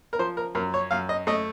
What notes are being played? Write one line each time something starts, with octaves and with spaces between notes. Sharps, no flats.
A#4
F3 C5
A#4
F#2 A#4
C#5
F#2 F5
D#5
A3 D#5